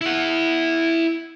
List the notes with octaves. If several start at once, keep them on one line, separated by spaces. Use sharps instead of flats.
E4 F#5